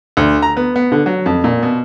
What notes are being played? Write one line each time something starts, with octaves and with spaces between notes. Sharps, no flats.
D2
A#5
B3
B3
D3
F#3
F2
A#2
B2